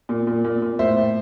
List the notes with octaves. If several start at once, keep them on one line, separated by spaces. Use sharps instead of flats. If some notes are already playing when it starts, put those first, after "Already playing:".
A#2
A#2
A#2
A#2
A2 C5 E5
A2